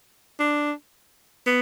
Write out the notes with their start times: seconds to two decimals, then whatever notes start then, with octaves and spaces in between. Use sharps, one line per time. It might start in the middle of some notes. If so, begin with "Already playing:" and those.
0.40 D4
1.46 B3